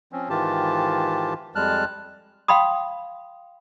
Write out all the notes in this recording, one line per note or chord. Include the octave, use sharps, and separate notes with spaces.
F3 C4 C#4
G#2 D#3 E3 F4 G4 A5
F2 G3 G#3 A5 F6 F#6
F5 G5 B5 C6 D#6